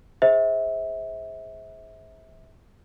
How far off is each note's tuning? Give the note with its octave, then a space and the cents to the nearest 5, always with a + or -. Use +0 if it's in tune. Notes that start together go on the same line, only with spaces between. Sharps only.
G#4 +0 C5 +5 E5 -30